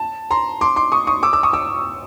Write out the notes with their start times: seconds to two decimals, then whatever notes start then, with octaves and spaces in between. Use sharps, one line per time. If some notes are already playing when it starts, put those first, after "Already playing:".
Already playing: A5
0.31 A#5 C6
0.61 C6 D6
0.76 C6 D6
0.92 C#6 D#6
1.07 C#6 D#6
1.23 D6 E6
1.33 D6 E6
1.43 C#6 D#6
1.53 D6 E6